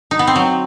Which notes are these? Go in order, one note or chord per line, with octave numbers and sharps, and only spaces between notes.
D#4
B3
C4
F#3